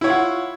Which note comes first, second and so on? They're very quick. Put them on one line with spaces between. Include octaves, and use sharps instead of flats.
E4 C#5 F4 F#5